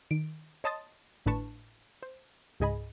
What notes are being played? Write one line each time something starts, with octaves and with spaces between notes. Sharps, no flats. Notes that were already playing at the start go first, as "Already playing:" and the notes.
D#3 D7
C#5 D#5 A5 C6 D#6 A6
G#1 A2 D4 B4 A5 C#6
C5
C#2 G#2 G#4 D#5 G#5 B5